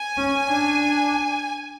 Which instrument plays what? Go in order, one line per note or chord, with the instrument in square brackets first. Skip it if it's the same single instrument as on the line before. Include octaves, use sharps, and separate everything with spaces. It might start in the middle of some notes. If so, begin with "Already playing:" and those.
Already playing: [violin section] G#5
[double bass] C#4
D4